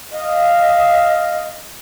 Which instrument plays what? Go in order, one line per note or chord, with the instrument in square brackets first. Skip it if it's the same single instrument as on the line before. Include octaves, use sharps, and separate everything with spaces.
[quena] D#5 [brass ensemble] F5